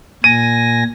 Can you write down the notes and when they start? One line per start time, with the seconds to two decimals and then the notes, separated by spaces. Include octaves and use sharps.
0.24 A#2 G#5 A#6 D#7